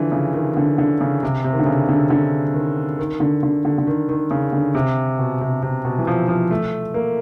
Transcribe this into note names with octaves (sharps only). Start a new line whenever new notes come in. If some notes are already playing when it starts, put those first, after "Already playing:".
Already playing: D3 E3 F3
C#3
D#3
D3
D3
C#3
C3
C3
D#3
D3
C#3
D3
D3
D#3
D#3
D3
D3
D3
D3
D#3
D#3
C#3
D3
C3
B2
C3
C3
B2
E3
F3
F3
A3
A#3